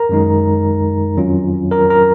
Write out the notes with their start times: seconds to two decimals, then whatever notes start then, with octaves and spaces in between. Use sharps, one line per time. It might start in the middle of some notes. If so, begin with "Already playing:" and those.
Already playing: A#4 A#5
0.09 F#2 D#3 G#3 D#4
1.17 F2 D#3 F#3 C#4 F4
1.71 A#4 A#5
1.90 A#4 A#5